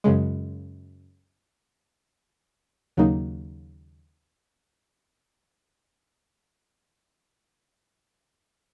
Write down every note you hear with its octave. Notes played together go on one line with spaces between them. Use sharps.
F#2 C#3 G#3
D#2 C#3 F#3 A#3 D#4